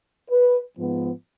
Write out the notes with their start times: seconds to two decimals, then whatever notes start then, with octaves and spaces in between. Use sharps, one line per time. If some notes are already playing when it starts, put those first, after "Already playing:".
0.31 B4
0.79 G#2 F3 B3